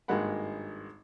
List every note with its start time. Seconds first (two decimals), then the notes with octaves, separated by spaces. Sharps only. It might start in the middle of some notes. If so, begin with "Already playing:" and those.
0.08 G#1 G2 G#3 A#3 F#5 B5